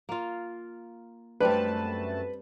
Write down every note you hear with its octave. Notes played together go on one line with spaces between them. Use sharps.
A#3 F4
F#2 G3 A3 C4 D4 B4 A5